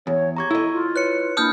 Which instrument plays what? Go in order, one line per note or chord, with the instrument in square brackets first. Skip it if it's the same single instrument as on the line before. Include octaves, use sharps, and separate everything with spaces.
[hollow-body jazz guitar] E2 [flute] C#5
[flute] G4 [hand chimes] A#5 C#6 G#6
[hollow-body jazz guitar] E4 D#5 [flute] A4
[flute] F4
[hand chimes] B4 C#5 [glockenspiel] F#6 C#7
[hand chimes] A#3 D4 A5 [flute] E4 [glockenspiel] D#6 F6 G6